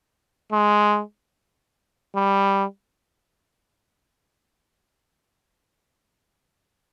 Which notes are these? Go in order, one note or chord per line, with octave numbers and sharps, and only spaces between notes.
G#3
G3